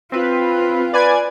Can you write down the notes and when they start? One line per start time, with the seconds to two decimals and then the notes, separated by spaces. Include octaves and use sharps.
0.12 C4 F4 B4
0.94 B4 D5 G#5 G#6